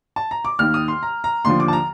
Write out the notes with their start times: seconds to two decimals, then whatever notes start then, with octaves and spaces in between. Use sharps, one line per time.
0.16 A5
0.31 A#5
0.45 D6
0.59 D#2 D#3 F6
0.74 D#6
0.88 C6
1.03 A#5
1.24 A#5
1.45 D#2 D3 F3 C6
1.60 D6
1.68 A5
1.73 A#5